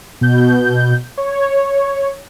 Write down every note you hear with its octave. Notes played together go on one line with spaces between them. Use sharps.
B2 G6
C#5